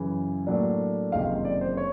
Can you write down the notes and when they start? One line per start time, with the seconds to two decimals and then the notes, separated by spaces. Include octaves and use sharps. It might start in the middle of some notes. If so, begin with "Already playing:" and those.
Already playing: F#2 C#3 E3
0.47 A2 F#3 A#3 D4
1.12 F#1 F2 C3 D#3 G#3 F5
1.45 D5
1.61 C5
1.77 C#5